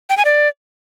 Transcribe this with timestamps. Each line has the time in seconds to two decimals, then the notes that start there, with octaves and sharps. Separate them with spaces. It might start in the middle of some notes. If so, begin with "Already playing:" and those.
0.10 G5
0.17 G#5
0.25 D5